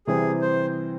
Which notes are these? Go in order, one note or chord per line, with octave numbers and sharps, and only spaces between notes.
C3 E3 G3 C4 G#4
C5